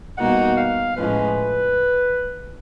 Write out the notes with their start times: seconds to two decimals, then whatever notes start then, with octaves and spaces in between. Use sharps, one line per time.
0.18 B2 G3 A#3 D#4 F#4 F#5
0.57 F5
0.96 A2 F3 G#3 C#4 B4